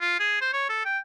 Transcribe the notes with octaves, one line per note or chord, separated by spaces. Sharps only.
F4
G#4
C5
C#5
A4
G5